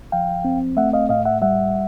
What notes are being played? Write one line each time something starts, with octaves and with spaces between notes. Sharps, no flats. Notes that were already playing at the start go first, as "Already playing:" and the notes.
F3 F5 G5
C4
A3 E5 F#5
D#5 F5
A2 D#5 F5
E5 F#5
G3 E5 F#5